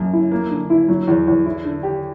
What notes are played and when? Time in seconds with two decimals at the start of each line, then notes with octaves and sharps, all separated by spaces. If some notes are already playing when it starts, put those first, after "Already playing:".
Already playing: F#2 A#3 C#4
0.13 E4
0.31 A#3
0.50 D3
0.70 E4
0.88 F#3
1.07 E2
1.27 E2
1.46 E4
1.64 D3
1.83 G4